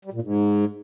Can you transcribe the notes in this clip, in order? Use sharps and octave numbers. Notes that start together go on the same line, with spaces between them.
G3
A#2
G#2